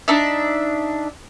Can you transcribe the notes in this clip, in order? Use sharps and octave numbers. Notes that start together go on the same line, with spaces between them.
D4 D#4 E5